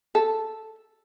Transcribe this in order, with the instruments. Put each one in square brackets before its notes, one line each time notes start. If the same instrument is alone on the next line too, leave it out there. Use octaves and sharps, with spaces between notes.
[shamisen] A4